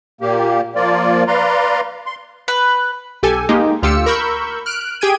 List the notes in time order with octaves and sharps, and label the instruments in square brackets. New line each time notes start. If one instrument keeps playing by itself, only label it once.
[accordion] A#2 A#3 G4
F3 A#3 F4 D5
B4 D5 F5 A#5 C6
C6
[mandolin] B4
[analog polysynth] B1 G4 A4 G#5
G#3 A#3 D#4 G4
D2 F4 G4 E6 C#7
A#4 B5 C#6 E6 G6
F6 F#6 D7
G4 G#4 G5 G#6 D#7